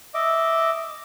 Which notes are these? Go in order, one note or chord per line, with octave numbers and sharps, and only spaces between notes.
D#5 E5 D6